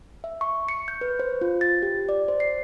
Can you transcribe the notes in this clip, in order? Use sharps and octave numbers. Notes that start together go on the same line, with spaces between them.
E5
C#6
C#7
G6
B4
C5
F4
A6
G4
D5
C5
C7